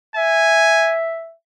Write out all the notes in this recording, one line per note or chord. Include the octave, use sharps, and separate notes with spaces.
E5 G#5